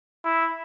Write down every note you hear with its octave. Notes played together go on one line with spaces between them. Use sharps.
E4